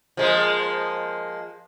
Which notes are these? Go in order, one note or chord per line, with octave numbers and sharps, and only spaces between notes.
F3 G#3 A#3